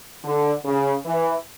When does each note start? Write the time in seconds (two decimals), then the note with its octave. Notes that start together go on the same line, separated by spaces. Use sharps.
0.24 D3
0.65 C#3
1.06 E3